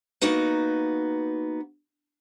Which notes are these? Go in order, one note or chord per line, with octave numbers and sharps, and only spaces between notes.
A#3 B3 D#4 F#4 B4